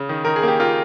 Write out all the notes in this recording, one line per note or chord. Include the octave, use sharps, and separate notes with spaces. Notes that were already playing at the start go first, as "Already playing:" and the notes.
Already playing: C#3
D#3
D#3 A#4
G#4
A#3 G4
A#3 F4